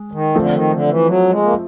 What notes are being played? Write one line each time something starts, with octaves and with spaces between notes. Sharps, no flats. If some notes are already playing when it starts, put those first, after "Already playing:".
Already playing: G#3
D#3
D3 F3 A3 C4
D#3
D3
E3
F#3
G#3
A#3